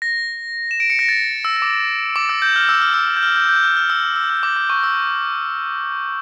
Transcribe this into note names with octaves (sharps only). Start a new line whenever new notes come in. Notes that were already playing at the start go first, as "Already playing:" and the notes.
A#6
E7
D7
C#7
A#6
A6
E6
E6
D6
D6
E6
G6
F6
E6
F6
E6
G6
F6
G6
G6
F6
F6
E6
E6
E6
D6
D6
C#6
E6